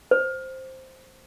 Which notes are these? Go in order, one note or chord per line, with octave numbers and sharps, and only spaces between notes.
C5